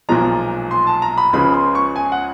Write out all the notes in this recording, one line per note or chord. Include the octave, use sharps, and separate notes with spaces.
B1 A#2 F3 G#3 A#5
C6
A5
A#5
B5
C#2 C#3 F3 G#3 B5
C6
C#6
G#5
F#5